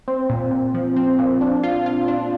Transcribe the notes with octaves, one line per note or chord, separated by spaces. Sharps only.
C4
A#2
A#2
F3
C4
A#2
D4
F4
F4
D4